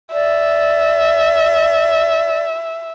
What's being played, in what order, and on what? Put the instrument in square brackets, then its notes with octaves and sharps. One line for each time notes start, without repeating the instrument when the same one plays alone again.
[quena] D5 [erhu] E5